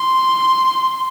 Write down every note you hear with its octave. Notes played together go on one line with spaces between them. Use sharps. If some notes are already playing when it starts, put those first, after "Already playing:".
Already playing: C6